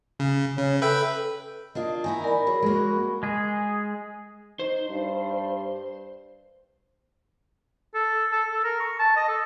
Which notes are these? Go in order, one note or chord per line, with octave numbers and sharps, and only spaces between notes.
C#3
C#3 C#5
A4 B4 E5 G5
A#3 D4 F4 D#5
D#3 D#4 E4 G#5
A#4 D5 B5
F#3 G#4 C#5
G#3 A#3 F#4
G#3 G#4
D#4 C5
G2
A4
A4
A4
A#4
C#6
A5
D#5
A4